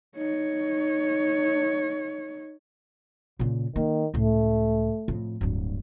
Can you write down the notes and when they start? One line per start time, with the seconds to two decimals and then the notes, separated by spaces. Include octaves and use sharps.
0.16 D#4 C#5
3.39 A#2 C#3
3.76 D#3 A#3
4.14 C#2 A2 A3
5.08 F2 A2
5.41 D1 G2